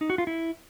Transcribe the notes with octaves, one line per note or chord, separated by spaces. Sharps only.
D#4
F#4
F4
E4